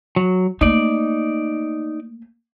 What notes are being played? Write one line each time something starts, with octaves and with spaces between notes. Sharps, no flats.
F#3
A3 A#3 D#4 D5